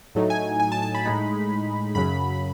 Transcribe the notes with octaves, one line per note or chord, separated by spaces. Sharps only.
A2 F#3 A3 D#4
G#5
G#5
A5
A5
B5
A2 G#3 D#4
F#2 C#3 F#3 B5